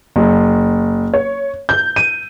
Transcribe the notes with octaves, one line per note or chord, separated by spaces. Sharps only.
F#1
C#5
G6
D#7